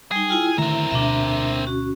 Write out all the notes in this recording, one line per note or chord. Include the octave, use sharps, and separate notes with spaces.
G3 D#4 G#4
E4 F4 G5
D3 D#3 A3 C4 E4 A#4 E5
D2 B2 D4 E5
C#4 F#4